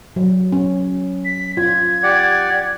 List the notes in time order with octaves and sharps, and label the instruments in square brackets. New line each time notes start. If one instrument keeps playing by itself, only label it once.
[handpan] F#3
C#4
[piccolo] B6
[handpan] F4 [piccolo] G#6
[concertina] G4 D5 F#5